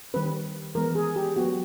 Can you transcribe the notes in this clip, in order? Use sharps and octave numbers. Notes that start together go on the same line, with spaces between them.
D#3 G3 C4 B4
E3 G#3 B3 A#4
G#4
G4
F#3 B3 F#4